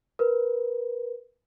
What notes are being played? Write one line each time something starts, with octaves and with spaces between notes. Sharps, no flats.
A#4 B4